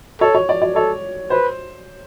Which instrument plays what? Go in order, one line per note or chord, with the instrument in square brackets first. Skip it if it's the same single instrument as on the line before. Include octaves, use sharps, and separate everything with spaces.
[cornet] A4 [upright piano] C#5
[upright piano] C#5
D5
D5
[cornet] A4 [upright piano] C#5
[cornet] B4 [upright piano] C5